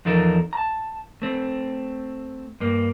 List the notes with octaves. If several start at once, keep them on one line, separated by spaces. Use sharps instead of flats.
E2 F3 D#4 A4 A#4
A5 A#5
A3 C4
G2 A#3